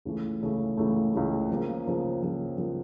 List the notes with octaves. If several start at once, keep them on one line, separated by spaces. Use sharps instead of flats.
C#2 C#3 E3 A3
C#2 C#3 E3 A3
C#2 C#3 E3 A3
C#2 C#3 E3 A3
C#3 F3 A#3
C#3 F3 A#3
C#3 F3 A#3
C#3 F3 A#3